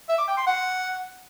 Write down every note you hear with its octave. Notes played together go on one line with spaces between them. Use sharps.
E5
D6
G5
C6
F#5